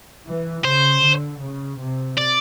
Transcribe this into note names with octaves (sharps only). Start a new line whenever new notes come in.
E3
C#3 C5
D3
C#3
C3
D5